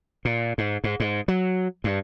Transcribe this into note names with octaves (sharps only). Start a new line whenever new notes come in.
A#2
G#2
G#2
G#2
F#3
G2